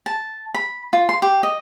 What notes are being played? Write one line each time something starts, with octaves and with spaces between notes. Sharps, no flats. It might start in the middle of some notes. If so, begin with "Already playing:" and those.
A5
B5
F4
C6
G4
D#5